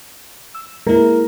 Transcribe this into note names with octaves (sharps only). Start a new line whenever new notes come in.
E6
G#3 A#3 E4 A#4